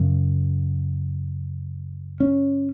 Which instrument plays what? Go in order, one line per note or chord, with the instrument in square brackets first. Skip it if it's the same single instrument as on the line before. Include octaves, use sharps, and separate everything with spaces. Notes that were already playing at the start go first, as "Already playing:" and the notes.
Already playing: [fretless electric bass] F#2 C#3
C#4